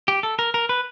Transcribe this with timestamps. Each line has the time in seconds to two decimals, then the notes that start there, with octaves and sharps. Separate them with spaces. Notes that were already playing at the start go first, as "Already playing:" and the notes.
0.08 G4
0.23 A4
0.39 A#4
0.54 A#4
0.69 B4